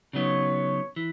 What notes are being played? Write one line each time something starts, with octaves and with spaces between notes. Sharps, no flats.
C#3 F#3 B3 D#4 C#5
E3